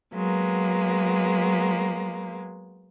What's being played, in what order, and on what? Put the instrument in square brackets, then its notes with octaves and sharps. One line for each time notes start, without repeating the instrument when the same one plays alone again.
[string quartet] F#3 G#3 A#3 B3